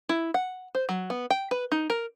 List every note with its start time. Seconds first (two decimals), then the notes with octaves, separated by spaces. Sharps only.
0.09 E4
0.34 F#5
0.75 C5
0.89 F#3
1.10 B3
1.30 G5
1.51 B4
1.72 D#4
1.90 A#4